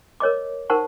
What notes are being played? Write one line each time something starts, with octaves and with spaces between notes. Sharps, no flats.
A#4 C#5 D#5 D6
D#4 A#4 C5 F#5 A5 C#6